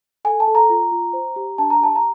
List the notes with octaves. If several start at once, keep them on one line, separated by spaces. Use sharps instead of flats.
A4 G#5
A5
A4
A#5
F4
F4
C5
G4
D4 A5
A#5
G4 A5
A#5